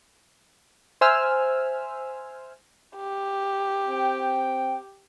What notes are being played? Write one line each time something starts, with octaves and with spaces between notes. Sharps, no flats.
C5 E5 G#5 E6 F6
G4
C4 G5